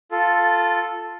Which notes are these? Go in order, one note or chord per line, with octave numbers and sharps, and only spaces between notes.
F4 A4